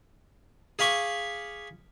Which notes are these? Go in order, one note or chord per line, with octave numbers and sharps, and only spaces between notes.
G#4 F5 B5 C#6 D6